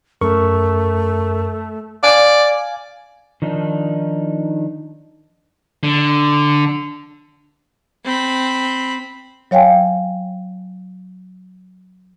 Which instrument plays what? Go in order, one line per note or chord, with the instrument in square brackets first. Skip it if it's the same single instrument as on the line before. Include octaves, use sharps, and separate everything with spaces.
[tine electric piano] F#2 A#4 C#6 [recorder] A3
[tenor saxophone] D5 [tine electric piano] F5 G#5 G#6
[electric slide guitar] D#3 F3 D4 D#4
[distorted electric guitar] D3
[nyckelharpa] C4 B5
[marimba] F#3 C#5 F5 G5 G#5